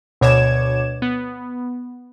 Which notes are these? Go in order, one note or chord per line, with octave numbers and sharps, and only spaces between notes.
D2 B2 C#5 D6 G#6 E7
B3